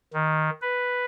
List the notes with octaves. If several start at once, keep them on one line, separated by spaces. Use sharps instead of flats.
D#3
B4